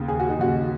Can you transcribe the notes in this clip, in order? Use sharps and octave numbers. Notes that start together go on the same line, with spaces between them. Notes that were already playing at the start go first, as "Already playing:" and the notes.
Already playing: D#2 C#3
G#4
F#4
D#4
D#2 C#3 F#4